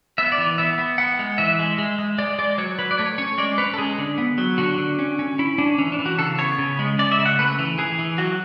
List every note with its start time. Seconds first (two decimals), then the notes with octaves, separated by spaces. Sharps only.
0.18 B3 E5
0.32 D5
0.38 E3
0.58 B3 E5
0.78 B3
0.98 B3 F#5
1.19 G#3
1.38 E3 E5
1.59 G#3
1.78 G#3
1.99 G#3
2.18 G#3 D5
2.39 G#3 D5
2.58 F#3 C#5
2.79 F#3 B4
2.91 D5
2.98 A3 C#5
3.18 C#4 C#5
3.38 G#3 D5
3.58 C#4 B4
3.74 A4
3.78 G#3 G#4
3.98 D3
4.18 B3
4.38 F#3
4.58 D3 F#4
4.78 D3
4.99 C#4
5.19 C#4
5.39 C#4 E4
5.58 C#4 D4
5.78 E3 C#4
5.92 D4
5.99 E3
6.06 F#4
6.18 C#3 A4
6.38 B3 C#5
6.59 C#3
6.79 G#3
6.99 G#3 D5
7.12 E5
7.18 C#3
7.26 F#5
7.39 A3 B4
7.59 E3
7.78 E3 G#4
7.99 E3
8.18 F#3 F#4